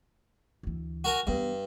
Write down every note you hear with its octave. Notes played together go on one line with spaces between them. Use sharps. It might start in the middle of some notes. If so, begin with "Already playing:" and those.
D2 E3
F#4 A#4 G#5
G2 E3 B3